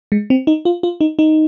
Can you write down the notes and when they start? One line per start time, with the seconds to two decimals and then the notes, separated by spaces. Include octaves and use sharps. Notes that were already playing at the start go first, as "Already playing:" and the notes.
0.12 G#3
0.30 C4
0.47 D#4
0.65 F4
0.83 F4
1.01 D#4
1.19 D#4